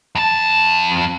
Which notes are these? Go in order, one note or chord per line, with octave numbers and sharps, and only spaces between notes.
F2 A5